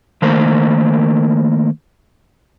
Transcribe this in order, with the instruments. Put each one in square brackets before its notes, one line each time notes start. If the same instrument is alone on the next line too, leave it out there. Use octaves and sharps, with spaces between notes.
[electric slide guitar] D#3 A3 A#3 A#4 C5